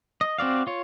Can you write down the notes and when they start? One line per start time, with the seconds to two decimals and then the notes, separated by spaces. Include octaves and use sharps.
0.21 D#5
0.38 C4 F#4 D5 F5
0.67 F4 C#5